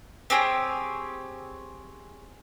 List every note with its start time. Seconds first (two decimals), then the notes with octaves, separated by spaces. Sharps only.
0.30 C4 G4 G#4 C#5